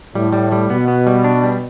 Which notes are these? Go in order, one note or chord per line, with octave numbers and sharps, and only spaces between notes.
A2 G3
G3
G3
B2 B3
B3
G3
D4
G3